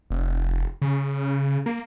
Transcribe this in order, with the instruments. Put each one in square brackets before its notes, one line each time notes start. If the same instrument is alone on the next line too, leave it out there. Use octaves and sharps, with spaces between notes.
[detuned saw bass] F1
C#3
A#3